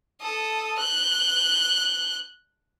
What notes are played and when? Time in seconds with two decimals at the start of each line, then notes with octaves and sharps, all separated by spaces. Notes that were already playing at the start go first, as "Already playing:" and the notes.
0.21 A4 D#6
0.78 F#6 G6